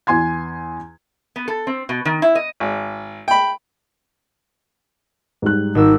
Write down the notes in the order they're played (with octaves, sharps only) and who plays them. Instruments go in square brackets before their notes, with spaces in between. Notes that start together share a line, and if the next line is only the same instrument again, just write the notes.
[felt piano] E2 G#5 C6 G#6
[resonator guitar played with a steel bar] B3
A4
C4
B2
D#3
E4
D#5
[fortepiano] G#1
G5 B5
[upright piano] G#2 G3 F#6
[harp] G#1 E6 [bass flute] D#4